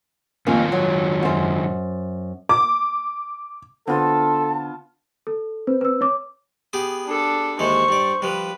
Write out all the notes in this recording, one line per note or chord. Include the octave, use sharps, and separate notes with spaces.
F2 G#2 D#3 A#3 C#4 F4
F#3
F#2 C5
D6
D3 B3 C4 F4 A4 A5
A4
C4 B4
B4 E6
C#5 D6
B3 G4 G#4
D4 A4
D#2 E3 G#3 C5 C#6
G2 D5
F3 G3 B4